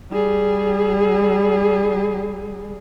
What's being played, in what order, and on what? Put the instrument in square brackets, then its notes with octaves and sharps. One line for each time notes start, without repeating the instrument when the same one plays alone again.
[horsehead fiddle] G3 G#4